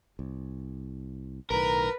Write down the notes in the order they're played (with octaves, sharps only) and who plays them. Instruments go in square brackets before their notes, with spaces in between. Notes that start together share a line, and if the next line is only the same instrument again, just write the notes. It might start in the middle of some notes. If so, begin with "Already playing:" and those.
[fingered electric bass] C2
[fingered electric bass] B1 A2 D#3 [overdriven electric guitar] A#4 [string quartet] B4 [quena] A#5